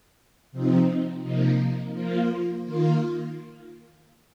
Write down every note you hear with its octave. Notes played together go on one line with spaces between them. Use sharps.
C3 F3 C4 D#4
C3 F3 A#3 D#4
F3 A#3 F4
D#3 A#3 F4